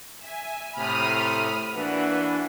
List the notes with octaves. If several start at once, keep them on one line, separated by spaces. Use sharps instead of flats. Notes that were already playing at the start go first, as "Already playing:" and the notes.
E5 G#5
A2 C3 B5 D#6 F6
E3 A#3 D4 F#4 B4